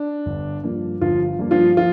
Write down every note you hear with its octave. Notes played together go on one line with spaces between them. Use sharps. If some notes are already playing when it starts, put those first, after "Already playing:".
Already playing: D4
G1
G2 F3 A#3
G1 F3 F4
G2 F3 A#3
F3 F4
F3 F4